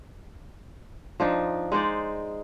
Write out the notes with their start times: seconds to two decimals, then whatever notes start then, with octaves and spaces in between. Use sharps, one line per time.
1.20 F3 D4 D#4
1.72 G#3 D#4 C5 D5